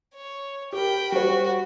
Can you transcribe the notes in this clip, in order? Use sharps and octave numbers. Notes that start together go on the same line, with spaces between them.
C#5
G4 A#4 G5 B5
G3 F#4 C#5